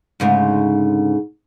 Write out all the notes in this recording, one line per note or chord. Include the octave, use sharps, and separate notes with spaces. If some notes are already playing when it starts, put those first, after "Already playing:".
D2 G#2 C#3